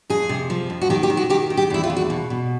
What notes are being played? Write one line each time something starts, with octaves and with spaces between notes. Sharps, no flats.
F2 G#4
C3
F3
F2
F#4
D#3 G4
G4
D#3
F#4
D#3 G4
D#3
G4
E2 E4
F4
E2
F#4
B2
B2